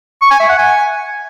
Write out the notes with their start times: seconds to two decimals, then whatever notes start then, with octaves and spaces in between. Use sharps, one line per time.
0.22 C#6
0.31 G#5
0.40 E5
0.49 F#5
0.58 G#5